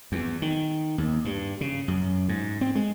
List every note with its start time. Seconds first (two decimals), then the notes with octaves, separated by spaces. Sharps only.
0.12 E2
0.42 D#3
0.98 D#2
1.25 G2
1.61 C#3
1.88 F#2
2.29 G#2
2.61 C4
2.75 G#3